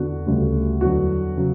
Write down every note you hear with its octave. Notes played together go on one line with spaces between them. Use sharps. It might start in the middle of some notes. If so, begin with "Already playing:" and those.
Already playing: E2 D3 F#4
D2 C#3 G3
E2 D3 F#3 F#4
C#3 F#3